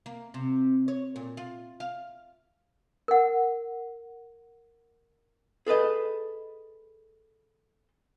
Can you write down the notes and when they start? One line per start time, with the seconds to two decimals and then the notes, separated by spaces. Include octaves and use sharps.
0.06 A#3
0.34 C3
0.88 C#5
1.16 A#2
1.37 F4
1.80 F5
3.08 A#4 F#5
5.66 G#4 A4 B4 D#5